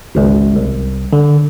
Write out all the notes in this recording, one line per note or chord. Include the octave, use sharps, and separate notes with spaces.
G#1 C#2
C2
D3